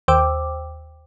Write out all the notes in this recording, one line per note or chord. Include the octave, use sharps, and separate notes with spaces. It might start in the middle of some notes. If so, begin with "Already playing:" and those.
D#2 C5 G5 D6 E6